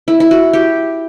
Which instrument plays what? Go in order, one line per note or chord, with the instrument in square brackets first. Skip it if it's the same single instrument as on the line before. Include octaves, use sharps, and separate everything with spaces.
[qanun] E4
E4
F#4
G4